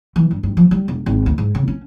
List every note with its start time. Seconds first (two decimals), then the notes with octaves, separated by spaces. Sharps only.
0.16 E3
0.31 G2
0.43 G2
0.57 F3
0.71 G3
0.88 E1
1.06 G#1
1.26 D2
1.38 G#2
1.55 C#3
1.68 C#4